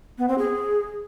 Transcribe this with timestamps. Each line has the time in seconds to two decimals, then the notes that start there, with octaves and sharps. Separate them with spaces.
0.18 B3
0.28 C4
0.38 G#4